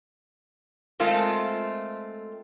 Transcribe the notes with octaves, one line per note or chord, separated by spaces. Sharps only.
G#3 A3 C4 F4 A4 A#4